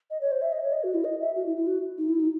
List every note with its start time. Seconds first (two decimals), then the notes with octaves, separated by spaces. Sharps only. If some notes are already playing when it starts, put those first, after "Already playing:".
0.11 D#5
0.21 C#5
0.32 C5
0.42 E5
0.53 D#5
0.63 C#5
0.73 D#5
0.84 F#4
0.94 E4
1.04 D#5
1.20 E5
1.36 F#4
1.47 E4
1.57 E4
1.67 F#4
1.98 D#4
2.09 E4
2.19 D#4